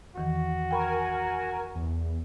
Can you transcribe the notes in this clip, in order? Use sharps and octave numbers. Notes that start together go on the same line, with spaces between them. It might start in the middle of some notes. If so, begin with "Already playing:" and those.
E2 D#3 E3 F#4
A#4 G5 G#5 B5 C#6
E2